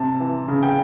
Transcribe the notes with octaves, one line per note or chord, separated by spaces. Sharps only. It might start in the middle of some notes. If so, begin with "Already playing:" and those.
Already playing: C3 A5
E3
C#3
G5